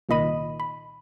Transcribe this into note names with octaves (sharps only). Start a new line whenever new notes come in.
C2 A#2 D#3 D#5 B5 D#7
B5